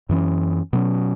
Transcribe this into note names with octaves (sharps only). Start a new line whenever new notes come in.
F#2 E3 C#4
B2 F#3 C#4